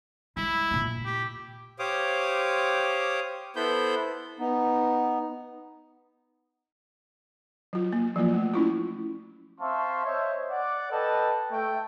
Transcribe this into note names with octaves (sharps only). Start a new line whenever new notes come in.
G#3 E4
A#2 F4
G4
G4 C5 C#5 F5 D6 D#6
B3 E4 A4 C5 B5 G6
B3 D#4
F#3 F4
A#3
F3 F#3 A#3 F4
A3
C#4 E4 F4
C4 E5 F5 A5 C6 C#6
C5 C#5 D#5 E5
D5 F#5
A4 B4 D#5 G5 A5
A3 G5